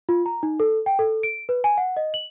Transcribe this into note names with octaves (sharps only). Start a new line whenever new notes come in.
F4
A#5
D#4
A4
G5
A4
D7
B4
G#5
F#5
D#5
F#7